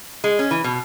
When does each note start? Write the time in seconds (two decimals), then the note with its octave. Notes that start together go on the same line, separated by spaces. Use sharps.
0.24 G#3
0.39 C#4
0.51 E3
0.64 B2